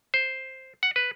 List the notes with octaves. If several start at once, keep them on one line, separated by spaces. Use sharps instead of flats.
C5
F#5
B4